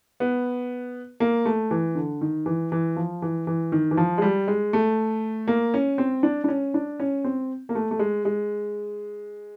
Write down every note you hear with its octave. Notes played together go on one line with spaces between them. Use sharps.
B3
A#3
A3
E3
D3
D#3
E3
E3
F3
E3
E3
D#3
E3
F3
G#3
G3
G#3
A3
A#3
C#4
C4
D4
D4
C#4
D4
C#4
C4
A#3
A3
A3
G#3
G#3